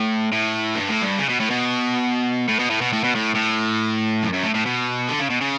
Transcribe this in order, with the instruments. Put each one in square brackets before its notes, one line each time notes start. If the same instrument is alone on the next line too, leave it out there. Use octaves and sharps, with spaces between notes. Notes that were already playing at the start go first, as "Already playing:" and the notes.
Already playing: [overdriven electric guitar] A2
A2
G2
A2
G2
C#3
B2
A2
B2
A2
B2
A2
B2
A2
B2
A2
A2
F#2
F#2
A2
A2
B2
D3
C#3
B2
C#3